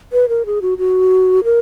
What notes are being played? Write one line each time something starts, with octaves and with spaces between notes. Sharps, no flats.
B4
A#4
G#4
F#4
F#4
A#4